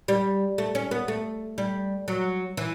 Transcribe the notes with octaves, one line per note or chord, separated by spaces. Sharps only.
G3
A3
C#4
B3
A3
G3
F#3
E3